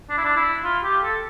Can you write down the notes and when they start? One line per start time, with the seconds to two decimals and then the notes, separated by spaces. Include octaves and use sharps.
0.10 D4
0.18 E4
0.25 D4
0.36 E4
0.64 F4
0.83 G4
1.03 A4